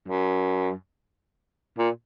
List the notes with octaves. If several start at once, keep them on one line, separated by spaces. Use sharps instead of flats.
F#2
A#2